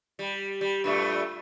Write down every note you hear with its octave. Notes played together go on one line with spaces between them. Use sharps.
G3
G3
G2 A#2 A3